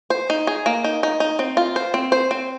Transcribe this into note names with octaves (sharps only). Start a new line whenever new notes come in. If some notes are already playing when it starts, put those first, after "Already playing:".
C5
D#4
G#4
A#3
D#4
D#4
D#4
C4
F4
C5
C4
C5
C4